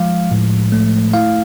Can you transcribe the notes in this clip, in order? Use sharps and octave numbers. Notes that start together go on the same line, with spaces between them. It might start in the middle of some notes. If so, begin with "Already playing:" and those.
Already playing: F3 G#3 F5
A2
A3
E4 F5